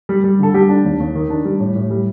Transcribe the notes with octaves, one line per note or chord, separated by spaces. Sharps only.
G3
G3
D3 A4
G3 G4
D4
D#2
D#2
D#3
D4
G3
A2
A2
G3